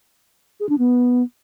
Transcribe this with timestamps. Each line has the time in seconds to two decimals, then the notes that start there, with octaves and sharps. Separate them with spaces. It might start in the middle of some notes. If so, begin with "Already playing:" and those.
0.60 G#4
0.69 D4
0.78 B3